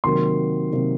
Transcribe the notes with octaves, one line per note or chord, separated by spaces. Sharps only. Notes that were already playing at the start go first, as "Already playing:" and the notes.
C3 D#3 F#3 A#3 C6
C3 D#3 F#3 A#3